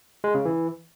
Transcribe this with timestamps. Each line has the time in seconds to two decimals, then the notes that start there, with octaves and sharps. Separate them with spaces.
0.24 G#3
0.35 C#3
0.45 E3